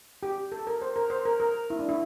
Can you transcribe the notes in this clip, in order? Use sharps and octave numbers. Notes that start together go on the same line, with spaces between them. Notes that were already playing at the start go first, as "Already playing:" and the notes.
G4
A4
A#4
C5
A#4
C5
A#4
A#4
E4
D4
E4